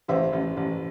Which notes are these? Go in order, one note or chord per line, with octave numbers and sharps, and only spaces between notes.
A1 C5 E5
A1
A1